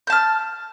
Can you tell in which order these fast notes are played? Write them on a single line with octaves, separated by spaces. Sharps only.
G6 A5 F6